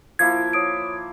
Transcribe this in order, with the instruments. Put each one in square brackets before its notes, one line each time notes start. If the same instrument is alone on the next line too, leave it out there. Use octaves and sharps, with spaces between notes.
[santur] F3 A#3 E4 [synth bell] G#6
[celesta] C#5 D#6 D7